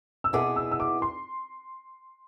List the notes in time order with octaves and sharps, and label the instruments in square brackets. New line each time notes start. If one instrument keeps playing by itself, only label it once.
[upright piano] E6
[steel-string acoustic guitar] B2 B3 E4 G#4 [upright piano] D6
[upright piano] E6
E6
D6
C6